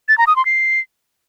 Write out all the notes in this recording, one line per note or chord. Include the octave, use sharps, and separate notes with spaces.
A6
A#5
D#6
C6
C7